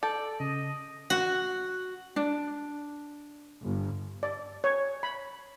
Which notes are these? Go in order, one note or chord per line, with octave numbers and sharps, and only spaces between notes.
A4 D5 G6
C#3 D#5
F#4
D4
G1
D5
C#5
B5